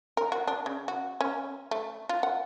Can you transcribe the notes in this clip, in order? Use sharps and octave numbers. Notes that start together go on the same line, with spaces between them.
A#4
F#4
D4
C#3
F#4
C#4
A3
F4
F#5